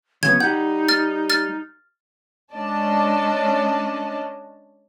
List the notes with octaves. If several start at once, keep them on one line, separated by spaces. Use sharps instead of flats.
C#3 F#3 B3 C#4 G#6
G3 D#4 F#5 G6
F6 A6
F6 A6
G#3 C#4 D4 D5 D#5 A5